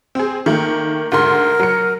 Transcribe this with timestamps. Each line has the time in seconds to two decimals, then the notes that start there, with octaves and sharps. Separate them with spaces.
0.15 C4 G#4
0.46 D#3 A3 A#3
1.12 D2 G#2 A#4 C6
1.59 F#3 C#7